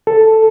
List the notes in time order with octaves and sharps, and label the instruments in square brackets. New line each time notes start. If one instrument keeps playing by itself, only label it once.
[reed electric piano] A4